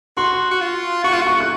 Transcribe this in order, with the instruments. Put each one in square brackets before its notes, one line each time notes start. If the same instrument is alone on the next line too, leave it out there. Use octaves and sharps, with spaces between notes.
[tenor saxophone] F#4 [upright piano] C6
[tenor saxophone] F#4
F4
[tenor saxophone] F#4 [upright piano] C#6
[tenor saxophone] F4
F#4
[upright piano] C#6
F#6